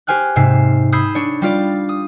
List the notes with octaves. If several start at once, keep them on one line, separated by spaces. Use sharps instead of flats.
G4 C5 G#5 F6 F#6
G#2 C3 E6 C7
B5 D#6 E6 G6 G#6 C7
D4 C#5
G3 F4 D5
D#6